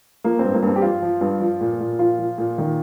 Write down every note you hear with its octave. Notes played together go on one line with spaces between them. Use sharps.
F3 A#3
G2 C4
A#3
G2 C4
G4
F3 F4
F3
G2
F3
A#2
A#2
F3 F4
F3
A#2
D#3